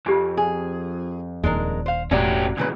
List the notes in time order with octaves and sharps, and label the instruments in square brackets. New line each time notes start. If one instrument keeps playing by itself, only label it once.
[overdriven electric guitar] F2 [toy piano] F4 G4 G#5
[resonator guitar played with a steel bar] G#4
[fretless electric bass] D#1 G#1 D#2 [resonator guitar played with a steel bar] G#3 D4 A#4
[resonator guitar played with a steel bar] C5 F5
[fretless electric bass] E1 A2 [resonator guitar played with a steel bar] F#3 F#4 D5 [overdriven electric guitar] C#4 G4
[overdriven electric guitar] B1 E2 [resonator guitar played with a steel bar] A#2 C#3 B4